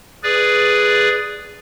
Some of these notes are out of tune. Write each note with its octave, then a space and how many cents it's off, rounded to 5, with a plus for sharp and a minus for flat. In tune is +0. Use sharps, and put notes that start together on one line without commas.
G#4 +0 B4 +0 D5 +0